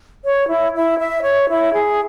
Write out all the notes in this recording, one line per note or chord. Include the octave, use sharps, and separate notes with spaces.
C#5
E4
E4
E5
C#5
E4
G#4